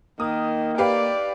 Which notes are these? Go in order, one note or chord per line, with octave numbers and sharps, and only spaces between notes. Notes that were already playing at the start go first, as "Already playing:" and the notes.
D#3 A#3 D#6
G4 B4 D5 F5